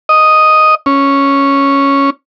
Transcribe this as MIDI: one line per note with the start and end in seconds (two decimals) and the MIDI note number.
0.09 0.75 75
0.86 2.10 61